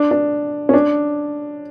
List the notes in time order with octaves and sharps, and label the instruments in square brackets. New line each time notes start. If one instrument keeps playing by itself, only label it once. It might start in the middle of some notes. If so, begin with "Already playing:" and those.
Already playing: [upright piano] D4
D4
C#4
D4